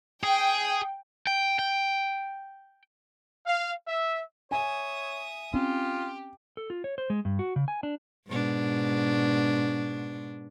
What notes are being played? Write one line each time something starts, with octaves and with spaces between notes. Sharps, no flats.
G#4 G5
G5
G5
F5
E5
C#5 E5 G#5 D#6
C4 C#4 F4 G4
A4
F4
C#5
C5
G#3
G2
F#4
C#3
G#5
D4
G#2 B2 D4